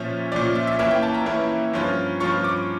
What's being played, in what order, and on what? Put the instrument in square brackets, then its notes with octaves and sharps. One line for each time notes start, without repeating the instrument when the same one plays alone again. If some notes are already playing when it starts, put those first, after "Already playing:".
Already playing: [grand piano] A#2 F3 C#4 E5
A#2 F3 C#4 D5
E5
E5
E3 A#3 C#4 E4 E5
G5
A5
A#5
E3 A#3 C#4 E4
G2 F3 C#4 F4
G2 F3 C#4 F4 C#6
D6